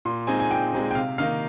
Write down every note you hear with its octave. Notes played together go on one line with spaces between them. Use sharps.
A#2 C6
G#3 C4 D#4 G#5
G#5
A#2 G5
G#3 C4 D#4
G5
C3 F5
D#3 A#3 D#4 F5